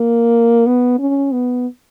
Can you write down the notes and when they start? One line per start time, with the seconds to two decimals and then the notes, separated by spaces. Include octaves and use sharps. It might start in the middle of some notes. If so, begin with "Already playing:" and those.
Already playing: A#3
0.67 B3
0.99 C#4
1.32 B3